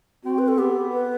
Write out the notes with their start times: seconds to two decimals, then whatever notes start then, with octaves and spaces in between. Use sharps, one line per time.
0.24 C4 F#4
0.38 B4
0.48 A4
0.58 B3 G4
0.93 B4